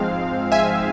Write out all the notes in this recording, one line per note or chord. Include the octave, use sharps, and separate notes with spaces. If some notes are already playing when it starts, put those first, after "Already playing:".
Already playing: G#2 F3 G#3 C4 F5
E5 G#5